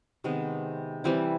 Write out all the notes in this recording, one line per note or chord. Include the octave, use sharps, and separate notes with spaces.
C3 D#3 G#3 B3
E3 G3 C4 E4